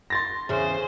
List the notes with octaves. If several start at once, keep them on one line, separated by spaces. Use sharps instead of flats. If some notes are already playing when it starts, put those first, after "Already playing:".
C6 A6 A#6
E2 C#3 G#4 C5